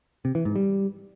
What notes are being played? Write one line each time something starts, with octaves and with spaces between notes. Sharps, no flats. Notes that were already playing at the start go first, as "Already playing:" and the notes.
C3
E3
G#2
G3